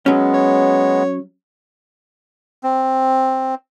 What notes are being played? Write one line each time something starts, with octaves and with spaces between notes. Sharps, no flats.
F#3 G#3 B3 C#4
C#5
C4